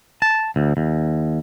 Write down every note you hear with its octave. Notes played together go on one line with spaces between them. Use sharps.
A5
D2
D#2